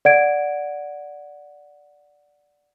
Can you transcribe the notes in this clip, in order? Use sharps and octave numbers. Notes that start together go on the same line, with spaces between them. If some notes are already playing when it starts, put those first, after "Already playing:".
D5 F#5 G#6 D7